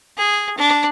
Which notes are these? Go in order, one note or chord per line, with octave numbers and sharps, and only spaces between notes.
G#4
D4